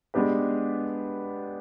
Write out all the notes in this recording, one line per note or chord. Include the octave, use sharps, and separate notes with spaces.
G#3 B3 D4 G4 B4